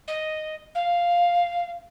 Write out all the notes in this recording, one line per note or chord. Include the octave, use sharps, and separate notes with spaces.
D#5
F5